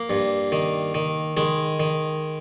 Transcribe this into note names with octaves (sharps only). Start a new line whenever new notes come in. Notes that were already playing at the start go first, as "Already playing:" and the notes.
Already playing: A#3
G2
D#3
D#3
D#3 G#3
D#3